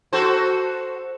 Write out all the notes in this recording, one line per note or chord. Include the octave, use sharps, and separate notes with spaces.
F#4 A4 C5